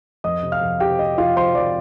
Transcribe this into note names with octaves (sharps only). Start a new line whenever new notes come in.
F2 D#5 D#6
C3
F5 F6
F2
C3 G4 G5
C3 D#5
F2 F4 F5
F2 C5 C6
F3 D5 D6